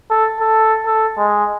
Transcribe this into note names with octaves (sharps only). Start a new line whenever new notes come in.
A4
A4
A4
G#3